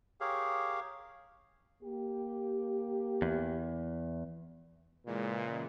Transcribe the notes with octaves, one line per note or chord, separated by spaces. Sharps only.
G4 G#4 A#4 C#5 F5
A#3 G4
E2
A#2 C#3 E3 G#3